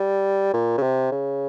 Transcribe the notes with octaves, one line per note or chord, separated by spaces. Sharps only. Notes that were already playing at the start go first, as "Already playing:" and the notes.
Already playing: G3
A#2
C#3
C3
C#3